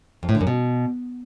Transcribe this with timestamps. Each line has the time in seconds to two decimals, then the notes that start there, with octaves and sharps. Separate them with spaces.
0.23 F2
0.29 A2
0.35 D3
0.41 F#2
0.47 B2